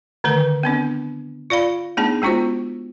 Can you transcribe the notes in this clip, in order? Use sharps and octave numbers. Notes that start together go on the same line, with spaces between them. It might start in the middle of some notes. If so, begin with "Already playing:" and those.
D3 D#3 A3 A#4 B4
B3 C4 D4
F4 D5 F5 B5
A3 B3 D4 D#4 G#4 A5
G#3 B3 C#4 F4 F#4 C5